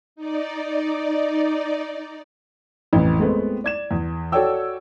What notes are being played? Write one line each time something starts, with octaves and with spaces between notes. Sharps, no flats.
D#4 D5
A1 F2 E3
G#3 A3 B3 C4
D5 G#6 E7
E2
F#4 A4 C#5 D5 G5 E6